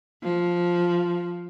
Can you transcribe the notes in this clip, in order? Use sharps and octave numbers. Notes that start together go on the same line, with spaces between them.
F3